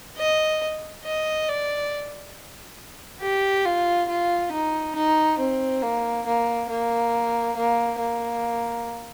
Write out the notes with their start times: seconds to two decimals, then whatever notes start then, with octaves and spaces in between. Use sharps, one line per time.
0.18 D#5
1.04 D#5
1.48 D5
3.22 G4
3.65 F4
4.09 F4
4.52 D#4
4.96 D#4
5.39 C4
5.82 A#3
6.26 A#3
6.69 A#3
7.56 A#3
7.99 A#3